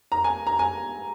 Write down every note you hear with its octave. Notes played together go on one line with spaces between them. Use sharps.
A#5
G#5
A#5
G#5